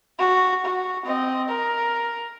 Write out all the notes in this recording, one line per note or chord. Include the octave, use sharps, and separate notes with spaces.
F#4
F#4
C4 D#5
A#4